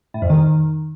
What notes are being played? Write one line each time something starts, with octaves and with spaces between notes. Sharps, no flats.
A2
F2
D#3